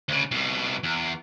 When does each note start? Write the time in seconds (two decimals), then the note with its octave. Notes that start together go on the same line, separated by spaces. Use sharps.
0.09 D2 C#3
0.31 C2 B2
0.83 E2